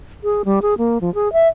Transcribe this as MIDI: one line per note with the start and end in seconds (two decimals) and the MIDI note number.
0.24 0.42 68
0.45 0.60 55
0.62 0.74 68
0.78 0.98 58
1.01 1.13 53
1.14 1.32 68
1.33 1.48 76